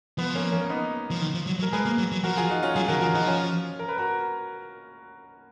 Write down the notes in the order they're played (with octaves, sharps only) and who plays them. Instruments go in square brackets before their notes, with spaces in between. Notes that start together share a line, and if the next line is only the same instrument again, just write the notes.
[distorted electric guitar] F3 [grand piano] B3
[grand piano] A#3 C#4
A#3 C#4
B3 D#4
[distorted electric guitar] F3
D#3
F3
F#3
F#3
[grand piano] A#4
[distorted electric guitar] G#3 [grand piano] G#4 B4
[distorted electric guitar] A#3
F#3
F#3
[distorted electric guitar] F3 [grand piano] F#4 A#4
[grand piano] F4 G#4
D#4 F#4
C#4 F4
[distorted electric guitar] F#3 [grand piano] F4 G#4
[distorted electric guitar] D#3 [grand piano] F#4 A#4
[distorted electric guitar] F3 [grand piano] F4 G#4
[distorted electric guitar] F3 [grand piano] D#4 F#4
[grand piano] C#4 F4
A#4
B4
F#4 A#4